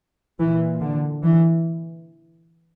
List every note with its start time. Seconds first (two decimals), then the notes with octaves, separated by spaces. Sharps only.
0.39 A#2 E3
0.81 D3
1.24 E3